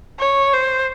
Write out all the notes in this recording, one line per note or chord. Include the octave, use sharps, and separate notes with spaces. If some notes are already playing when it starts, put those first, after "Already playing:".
C#5
C5